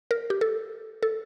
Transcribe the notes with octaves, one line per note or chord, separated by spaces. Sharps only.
A#4
G4
A4
A4